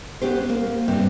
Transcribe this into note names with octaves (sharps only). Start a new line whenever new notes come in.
B3 C#4 G4 C5
A#3
G2 C3 C4